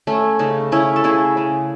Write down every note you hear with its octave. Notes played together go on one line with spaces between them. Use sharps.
A3 C#4
C#3 D#4
A3 C#4 E4
A4
C#3 E4 G#4
C#3